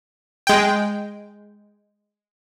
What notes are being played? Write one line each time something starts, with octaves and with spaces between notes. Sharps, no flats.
G#3 G5